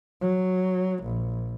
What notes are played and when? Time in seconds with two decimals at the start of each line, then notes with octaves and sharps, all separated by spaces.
0.21 F#3
1.03 A#1